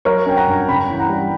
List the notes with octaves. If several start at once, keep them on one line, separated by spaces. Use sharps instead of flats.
F#3 A#4 C#5
C#4 G5
F#5 A#5
G2
C#3 G5 B5
E3
F#5 A#5
G3